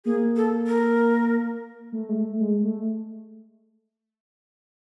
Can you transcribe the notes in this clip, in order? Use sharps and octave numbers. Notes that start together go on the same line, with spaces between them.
A#3 G#4
A4
A#4
A3
G#3
A3
G#3
A3